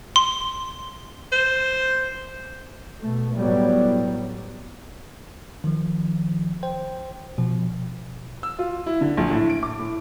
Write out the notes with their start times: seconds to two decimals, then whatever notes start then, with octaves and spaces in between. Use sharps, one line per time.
0.16 C6
1.32 C5
3.03 B2 A3
3.36 A2 F#3 G3 B3
5.64 D#3 F3
6.63 C5 G5
7.38 B2 F3
8.43 E6
8.59 F4
8.86 E4
9.01 D3
9.17 A#1
9.30 A2
9.50 D7
9.63 D6
9.79 A2